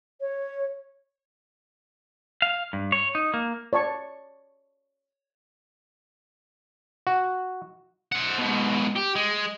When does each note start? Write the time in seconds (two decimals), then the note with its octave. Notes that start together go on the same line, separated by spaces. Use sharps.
0.21 C#5
2.42 F5
2.73 G2
2.92 C#5
3.15 D#4
3.34 A#3
3.73 C#5 D5 A5 C#6
7.07 F#4
8.12 C5 F#5
8.38 G#2 B2
8.96 G4
9.15 G#3